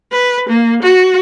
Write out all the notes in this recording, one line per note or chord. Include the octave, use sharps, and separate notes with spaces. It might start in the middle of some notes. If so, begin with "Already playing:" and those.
B4
A#3
F#4